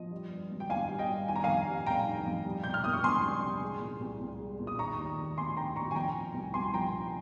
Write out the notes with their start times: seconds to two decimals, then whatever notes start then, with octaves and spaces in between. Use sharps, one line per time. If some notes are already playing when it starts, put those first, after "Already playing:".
Already playing: F3 D#5
0.11 G3
0.30 G2
0.51 G#1
0.60 G5
0.70 G#1 F5 G#5
0.89 G3
0.99 D#5 G5
1.09 G2
1.28 D#3 G#5
1.36 A#5
1.44 F2 F5 G#5
1.67 G3
1.86 F1 G5 A#5
2.06 D#3
2.26 F2
2.45 G3
2.64 C3 G6
2.74 F6
2.84 A#3 D#6
2.94 C#6
3.03 C#2 G#5 C6
3.22 G3
3.43 C3
3.62 G#3
3.81 A#2
4.00 C2
4.21 C2
4.39 G#3
4.59 A#2
4.67 D#6
4.79 D#3 A#5 C#6
4.98 D#2
5.17 F1
5.37 F1 G#5 C6
5.57 D#3 G5 A#5
5.76 D#2 A#5 C#6
5.91 G#5
5.95 F3 G5 A#5
6.15 C3
6.34 C2
6.54 C2 G#5 C6
6.74 F3 G5 A#5
6.93 C3